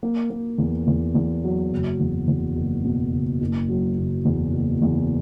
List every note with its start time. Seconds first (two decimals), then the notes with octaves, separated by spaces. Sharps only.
0.03 A#3
0.30 A#3
0.58 E2
0.87 E2
1.15 E2
1.44 F#3
1.72 F#1
1.99 E2
2.27 E2
2.56 F#1
2.84 B2
3.13 F#1
3.41 F#1
3.69 F#3
3.98 F#1
4.25 E2
4.53 F#1
4.82 E2